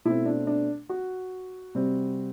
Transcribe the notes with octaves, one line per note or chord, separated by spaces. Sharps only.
B2 A3 C4 E4
D4
D4
F#4
C3 G3 C4